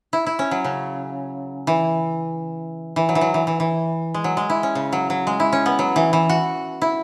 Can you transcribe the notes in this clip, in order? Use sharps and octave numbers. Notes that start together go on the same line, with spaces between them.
E4
E4
C#4
F#3
C#3
E3
E3
F#3
E3
F#3
E3
E3
E3
G#3
F#3
G#3
E4
C#4
C#3
F#3
F#3
G#3
E4
C#4
B3
F#3
E3
E3
F#4
E4